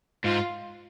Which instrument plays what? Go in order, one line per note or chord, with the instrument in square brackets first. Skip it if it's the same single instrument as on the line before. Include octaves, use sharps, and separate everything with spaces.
[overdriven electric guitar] G#2 [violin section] F4